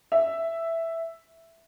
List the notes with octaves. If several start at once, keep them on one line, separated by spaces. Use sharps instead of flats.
E5